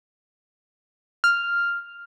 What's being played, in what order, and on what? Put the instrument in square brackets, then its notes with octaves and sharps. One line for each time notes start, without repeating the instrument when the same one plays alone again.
[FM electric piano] F6